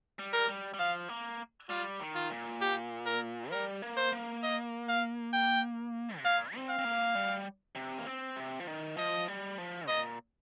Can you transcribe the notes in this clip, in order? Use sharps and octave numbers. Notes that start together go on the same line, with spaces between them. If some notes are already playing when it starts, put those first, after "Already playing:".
G3
A#4
G3
G3
F3 F5
A#3
G3 F4
D#3
F4
A#2
G4
A#4
G3 A#4
A#3
C5
A#3
D#5
F5
G5
C3
A#2 F5
C4
F5
C4
A#3
G3
C3
A#3
C4
C3
F3
D#3
F3 D#5
G3
F3
A#2 D#5